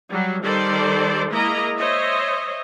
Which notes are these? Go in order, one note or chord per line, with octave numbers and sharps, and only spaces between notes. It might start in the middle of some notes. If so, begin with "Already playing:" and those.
F#3 G3
D#3 G3 A4 C5 D5
G#3 A#3 E4 A#4 D#5 A#5
C5 C#5 D#5 E5